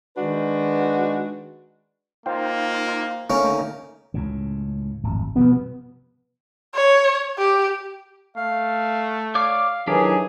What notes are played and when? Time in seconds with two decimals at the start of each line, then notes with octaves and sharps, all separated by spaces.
0.17 D#3 G#3 D4 F#4 B4
2.26 A#3 D#4 F4 C5 F5 G5
3.30 D3 A3 A#3 C#4 D#4
4.14 C#2 A2 C#3
5.03 D1 G#1 F2
5.36 B2 F3 G3 B3
6.75 C#5
7.38 G4
8.36 A3 F5
9.35 C#5 D5 F5 D6
9.87 D#3 E3 F#3 D4 G4 G#4